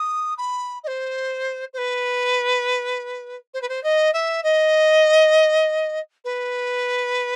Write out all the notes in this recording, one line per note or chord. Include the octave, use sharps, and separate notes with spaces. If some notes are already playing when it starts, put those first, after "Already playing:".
Already playing: D#6
B5
D#5
C5
C5
B4
C5
B4
C5
D#5
E5
D#5
B4